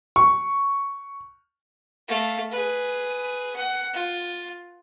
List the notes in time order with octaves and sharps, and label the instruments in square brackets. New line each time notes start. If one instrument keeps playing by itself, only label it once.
[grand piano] C#6
[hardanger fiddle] A3 F5
G#4 B4
F#5
F4